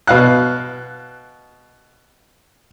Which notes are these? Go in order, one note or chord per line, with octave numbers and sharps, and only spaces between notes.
B2 F5 F#6